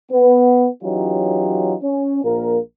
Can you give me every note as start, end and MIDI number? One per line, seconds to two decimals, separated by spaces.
0.12 0.67 59
0.84 1.75 52
0.84 1.75 54
0.84 1.75 61
0.84 1.75 63
0.84 1.75 65
0.84 1.75 67
1.83 2.20 61
2.24 2.59 34
2.24 2.59 46
2.24 2.59 58
2.24 2.59 70